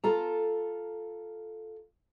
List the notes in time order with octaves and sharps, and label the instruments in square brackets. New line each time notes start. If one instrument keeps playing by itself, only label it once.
[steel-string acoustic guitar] F4 A4 A#5